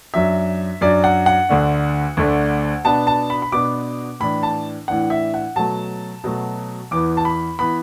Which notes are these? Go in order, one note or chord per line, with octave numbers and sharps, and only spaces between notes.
F#2 F#3 D4 E5
F#2 F#3 D4 D5
F#5
F#5
D2 D3 A3 D4
D2 D3 A3 D4
B2 B3 D4 A5
A5
B5
B5
B2 B3 D4 D6
A2 E3 D4 B5
A5
A2 E3 D4 F#5
E5
F#5
B2 F#3 A3 A5
B2 F#3 A3
E2 E3 B3 D6
A5
B5
E3 B3 B5